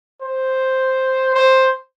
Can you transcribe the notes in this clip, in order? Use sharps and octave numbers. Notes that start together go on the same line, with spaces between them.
C5
C5